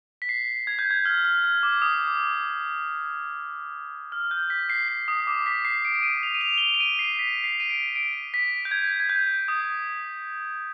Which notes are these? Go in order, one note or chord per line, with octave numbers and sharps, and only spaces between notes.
B6
C7
G#6
G6
G#6
F6
F6
F6
D6
D#6
D6
F6
G6
B6
C7
C7
D#6
D6
B6
C7
D7
D7
D#7
F7
D#7
F7
G7
F7
D7
D#7
C7
B6
C7
D#7
D7
D7
B6
G6
G#6
G#6
G6
D#6